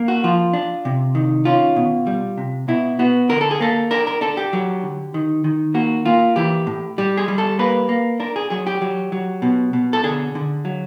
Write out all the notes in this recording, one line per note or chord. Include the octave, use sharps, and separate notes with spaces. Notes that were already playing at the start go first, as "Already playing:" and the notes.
Already playing: A#3
F#4
F3 F4
D4
C3
D#3
C#4 F4
B2
G3
C3
B2 E4
B3 F#4
D3 A#4
A4
G#4
A#3 A4
D4 A#4
A#4
D4 A4
G4
F#3
D3
D#3
D#3
A#3 F#4
A#3 F4
E3 G4
A2
G3 G4
G#4
G3
A4
A#3 B4
A#3
D4 A#4
G#4
F#3 G#4
G4
F#3
F#3
B2
B2
A4
D3 G#4
D3
F#3